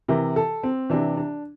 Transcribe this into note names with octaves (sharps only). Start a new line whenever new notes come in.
C3 E3 A#4
A4
C4
C3 E3 D4
D4